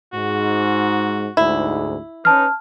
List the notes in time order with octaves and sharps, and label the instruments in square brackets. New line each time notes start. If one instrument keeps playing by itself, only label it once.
[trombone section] G#2 [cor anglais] F#4
[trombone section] D2 G#2 [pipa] E4
[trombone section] C#4 B4 [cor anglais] D#4 [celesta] A5 F6